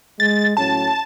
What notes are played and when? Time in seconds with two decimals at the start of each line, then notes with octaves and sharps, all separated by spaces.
0.20 G#3 A6
0.57 A2 F#3 C#4 A5